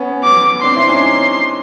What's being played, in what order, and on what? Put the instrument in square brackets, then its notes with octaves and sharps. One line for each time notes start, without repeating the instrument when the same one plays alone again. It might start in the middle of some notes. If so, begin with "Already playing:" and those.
Already playing: [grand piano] B3 C#4
[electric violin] D6
[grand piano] C4 D4 [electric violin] C6
[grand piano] D4 E4
C#4 D#4